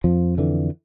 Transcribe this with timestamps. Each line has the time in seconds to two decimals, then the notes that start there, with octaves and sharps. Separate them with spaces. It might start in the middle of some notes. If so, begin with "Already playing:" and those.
0.04 F2 F3
0.38 D3 E3